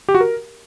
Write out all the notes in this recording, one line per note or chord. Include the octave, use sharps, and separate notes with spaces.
G4
F#4
A#4